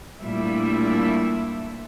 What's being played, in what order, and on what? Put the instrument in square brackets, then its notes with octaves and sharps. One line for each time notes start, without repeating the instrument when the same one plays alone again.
[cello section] A#2 G3 A3 D4 E4 E5